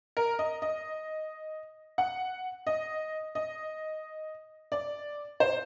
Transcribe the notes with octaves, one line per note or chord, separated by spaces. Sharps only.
A#4
D#5
D#5
F#5
D#5
D#5
D5
C5